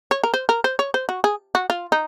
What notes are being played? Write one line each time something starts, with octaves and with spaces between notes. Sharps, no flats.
C#5
A#4
C5
A#4
C5
C#5
C5
F#4
G#4
F#4
F4
D#4